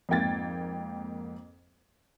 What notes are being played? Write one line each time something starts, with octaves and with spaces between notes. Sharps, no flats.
F2 G#2 A#3 G5 G#6 A6